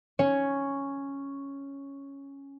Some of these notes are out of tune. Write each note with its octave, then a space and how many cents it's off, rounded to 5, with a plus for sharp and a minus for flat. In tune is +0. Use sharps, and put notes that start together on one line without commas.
C#4 +0 C#5 +0